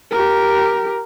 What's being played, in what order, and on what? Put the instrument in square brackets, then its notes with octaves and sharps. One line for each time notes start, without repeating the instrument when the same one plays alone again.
[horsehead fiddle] G4 A#4